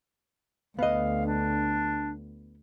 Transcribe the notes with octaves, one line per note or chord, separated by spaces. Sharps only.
D2 B3 D#5 F5
D4